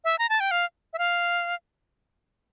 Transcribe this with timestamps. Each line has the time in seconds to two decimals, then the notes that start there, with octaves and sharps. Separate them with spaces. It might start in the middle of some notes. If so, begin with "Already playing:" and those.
0.04 E5
0.19 A#5
0.29 A5
0.40 G5
0.51 F5
0.93 E5
0.98 F5